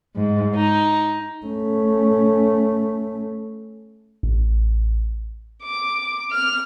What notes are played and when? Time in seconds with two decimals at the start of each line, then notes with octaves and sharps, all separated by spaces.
0.16 G#2
0.56 D#4
1.46 A3 C#4
4.23 A1
5.63 D6
6.32 F6